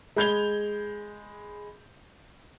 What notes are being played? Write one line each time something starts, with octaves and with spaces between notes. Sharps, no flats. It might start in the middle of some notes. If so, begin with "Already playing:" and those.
G#3 B5 G6 G#6 F7 G7